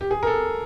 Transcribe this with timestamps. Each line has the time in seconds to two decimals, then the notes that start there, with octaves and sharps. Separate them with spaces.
0.01 G4
0.11 G#4
0.23 A#4
0.27 A4